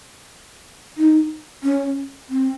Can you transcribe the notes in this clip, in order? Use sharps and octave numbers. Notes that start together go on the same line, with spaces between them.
D#4
C#4
C4